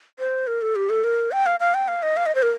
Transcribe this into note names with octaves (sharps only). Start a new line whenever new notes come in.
C5
A#4
A4
G4
A4
A#4
G5
F5
F5
G5
F5
D#5
F5
D#5
C5
A#4